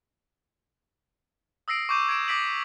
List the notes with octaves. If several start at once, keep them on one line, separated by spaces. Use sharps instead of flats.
D#6 E6 A#6 C7 D7
C#6 D6 G6 D#7 E7
G#6 D7 E7
D6 D#6 A#6 B6 D7 F#7